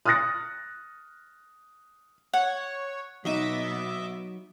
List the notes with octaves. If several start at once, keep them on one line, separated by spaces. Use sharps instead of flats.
D#6 F6 F#6 A6 A#6 C#7
C#5 F#5
B2 F#3 B3 D#4 D#5 E5 D6